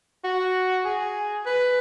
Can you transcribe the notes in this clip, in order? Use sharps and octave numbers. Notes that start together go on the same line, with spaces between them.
F#4
G#4
B4